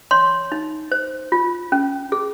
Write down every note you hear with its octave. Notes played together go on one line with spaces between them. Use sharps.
C#5 C6
D#4
C5
F4
C#4
G#4